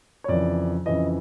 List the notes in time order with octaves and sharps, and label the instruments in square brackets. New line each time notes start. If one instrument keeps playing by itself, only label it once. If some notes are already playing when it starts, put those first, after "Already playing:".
[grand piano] C#5
F2 C#3 E3 D5
F2 C#3 E3 D#5